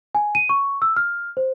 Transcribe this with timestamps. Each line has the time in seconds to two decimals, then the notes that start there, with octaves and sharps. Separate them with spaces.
0.15 G#5
0.35 D#7
0.49 C#6
0.82 E6
0.97 F6
1.37 C5